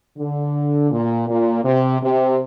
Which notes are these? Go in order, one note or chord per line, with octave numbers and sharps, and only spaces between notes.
D3
A#2
A#2
C3
C3